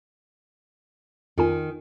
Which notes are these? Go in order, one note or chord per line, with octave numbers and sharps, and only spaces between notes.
F2 D#3 F4 G#5